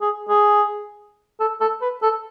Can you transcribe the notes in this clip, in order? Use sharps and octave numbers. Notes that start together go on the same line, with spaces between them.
G#4
G#4
A4
A4
B4
A4